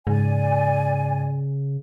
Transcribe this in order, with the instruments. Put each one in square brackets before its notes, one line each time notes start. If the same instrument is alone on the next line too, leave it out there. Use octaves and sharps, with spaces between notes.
[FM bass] G#2 [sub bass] C#3 [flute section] D5 G#5